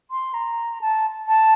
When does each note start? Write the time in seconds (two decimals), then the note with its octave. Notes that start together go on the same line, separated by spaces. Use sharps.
0.11 C6
0.34 A#5
0.81 A5
1.28 A5